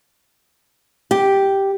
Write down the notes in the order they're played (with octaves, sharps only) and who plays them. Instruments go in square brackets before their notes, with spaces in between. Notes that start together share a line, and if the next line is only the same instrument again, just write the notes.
[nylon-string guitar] G4